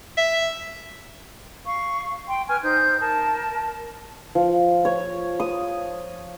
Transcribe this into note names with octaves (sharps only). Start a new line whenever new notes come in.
E5
F5 C#6
G5 C6
B4 G#5 F6
D#4 C5 G6
A#4 A5
F3
C#5
D#6